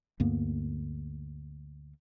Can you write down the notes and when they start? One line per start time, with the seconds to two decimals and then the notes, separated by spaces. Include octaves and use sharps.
0.20 D2 G2 A#3 B3